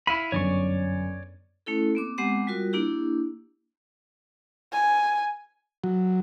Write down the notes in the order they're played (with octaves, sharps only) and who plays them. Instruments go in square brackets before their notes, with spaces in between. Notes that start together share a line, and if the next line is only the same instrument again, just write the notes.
[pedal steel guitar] E4 F5 B5 [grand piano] D#7
[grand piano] G1 F#2 [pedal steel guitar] C#5 D5 C#6
[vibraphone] A3 C#4 E4 A4
A#3 C4 D6
G#3 B3 C4 G4 F#5 D6
G3 F4 F#4 A#4
A#3 D4 E4 G4
[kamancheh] G#5
[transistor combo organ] F#3